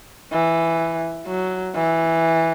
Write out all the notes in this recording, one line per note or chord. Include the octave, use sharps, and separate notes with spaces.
E3
F#3
E3